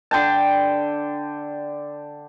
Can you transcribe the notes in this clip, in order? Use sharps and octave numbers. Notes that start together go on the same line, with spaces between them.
D3 G5 A5